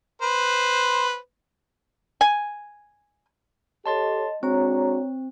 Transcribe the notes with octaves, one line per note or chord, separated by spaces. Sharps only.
B4 C5
G#5
G4 A4 C#5 D#5 A5 C6 A6
G#3 C4 D4 F#4 C#5 A#5